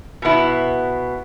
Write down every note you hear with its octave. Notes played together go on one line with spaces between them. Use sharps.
B2 B3 E4